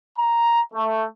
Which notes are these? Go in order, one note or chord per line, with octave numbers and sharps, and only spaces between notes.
A#5
A3